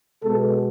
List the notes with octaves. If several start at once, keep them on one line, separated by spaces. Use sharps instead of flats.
B2 G#3 B3 A4